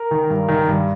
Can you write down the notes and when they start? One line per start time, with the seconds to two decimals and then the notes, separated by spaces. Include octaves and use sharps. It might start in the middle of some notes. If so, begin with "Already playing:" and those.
Already playing: A#4
0.11 D#3
0.30 G2
0.48 D#3
0.68 G2